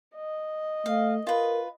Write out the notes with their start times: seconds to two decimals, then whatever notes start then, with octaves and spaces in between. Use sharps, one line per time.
0.16 D#5
0.86 A3 F5
1.27 F4 A#4 B4